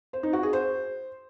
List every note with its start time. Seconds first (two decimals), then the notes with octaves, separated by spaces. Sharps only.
0.13 C5
0.23 D#4
0.33 F#4
0.43 G#4
0.53 C5